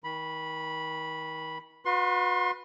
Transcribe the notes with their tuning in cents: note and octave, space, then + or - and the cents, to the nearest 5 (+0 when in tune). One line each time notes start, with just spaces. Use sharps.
D#3 +35 B5 -10
F#4 -40 B4 +0 C6 +30